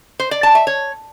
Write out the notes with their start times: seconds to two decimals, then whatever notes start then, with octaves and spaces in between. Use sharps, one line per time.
0.20 C5
0.31 D5
0.43 A5
0.55 E5
0.67 C#5